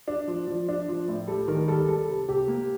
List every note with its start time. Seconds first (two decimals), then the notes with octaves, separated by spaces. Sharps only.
0.08 D4
0.28 F3
0.47 F3
0.69 D4
0.88 F3
1.08 A2
1.28 G3 A4
1.48 D#3 A#4
1.68 G3 A4
1.88 G3 A4
2.08 C3
2.28 C3 G4
2.48 A#3